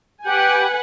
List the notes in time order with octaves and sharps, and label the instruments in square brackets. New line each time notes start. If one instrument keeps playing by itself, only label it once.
[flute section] G4 G6 [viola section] B4 F#5 G#5